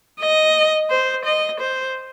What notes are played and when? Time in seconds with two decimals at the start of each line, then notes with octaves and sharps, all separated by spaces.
0.20 D#5
0.90 C5
1.25 D#5
1.60 C5